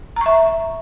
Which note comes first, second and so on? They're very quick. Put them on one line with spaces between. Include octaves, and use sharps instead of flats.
A#5 C#6 E5